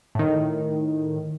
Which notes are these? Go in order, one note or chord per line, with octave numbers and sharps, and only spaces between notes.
A2 D#3